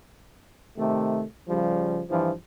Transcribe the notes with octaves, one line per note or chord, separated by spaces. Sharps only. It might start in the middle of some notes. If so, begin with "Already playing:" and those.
C3 D#3 A3
C#3 F3 G3
G2 E3 F3